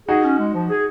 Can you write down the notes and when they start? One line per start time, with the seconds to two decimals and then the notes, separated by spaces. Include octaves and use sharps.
0.08 D#4 F#4 G#4
0.24 C#4
0.39 G#3
0.54 F3
0.70 G#4